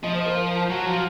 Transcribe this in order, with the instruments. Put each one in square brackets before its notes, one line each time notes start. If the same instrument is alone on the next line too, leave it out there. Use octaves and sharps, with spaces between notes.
[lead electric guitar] F3 [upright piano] D#5
[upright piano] C5
A#4
[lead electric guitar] F#3 [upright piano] F#4
[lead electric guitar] F3
[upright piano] F4